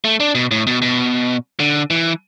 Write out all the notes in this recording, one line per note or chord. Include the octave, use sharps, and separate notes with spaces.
A3
D4
B2
A2
B2
B2
D3
E3